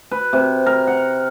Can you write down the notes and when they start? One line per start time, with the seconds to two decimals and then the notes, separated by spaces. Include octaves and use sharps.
0.12 B4
0.33 C3
0.66 A#4
0.87 F#5